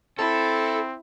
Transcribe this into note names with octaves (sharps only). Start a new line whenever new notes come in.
C4 E4 A4